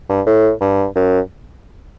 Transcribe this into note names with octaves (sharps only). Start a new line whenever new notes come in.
G2
A2
G2
F#2